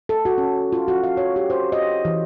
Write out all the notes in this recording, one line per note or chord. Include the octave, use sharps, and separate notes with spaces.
A4
F#4
C#4
F4
F#4
F5
C#5
G4
C5
D#5
E3